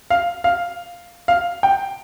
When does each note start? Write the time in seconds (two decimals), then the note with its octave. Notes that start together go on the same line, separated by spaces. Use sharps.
0.10 F5
0.44 F5
1.28 F5
1.63 G5